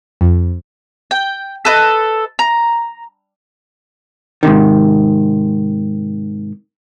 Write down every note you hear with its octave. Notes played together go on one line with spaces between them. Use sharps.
F2
G5
A4 B4 D#5
A#5
G#2 C3 D#3